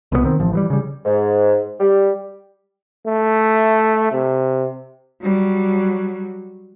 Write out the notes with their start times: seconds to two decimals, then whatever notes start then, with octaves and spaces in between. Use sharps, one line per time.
0.12 C2 B2 G#3 B3
0.24 D#3 C4
0.40 A1 F3
0.53 E3 F#3 G3
0.70 C#3 G3
1.05 G#2
1.80 G3
3.07 A3
4.12 C3
5.22 F#3 G3